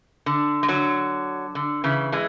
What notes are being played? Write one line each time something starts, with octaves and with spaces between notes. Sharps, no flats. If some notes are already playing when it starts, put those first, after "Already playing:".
D3
G#3
D3 F#3
D3
C#3 E3
E3 G#3